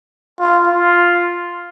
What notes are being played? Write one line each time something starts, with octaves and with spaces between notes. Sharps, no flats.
F4
F4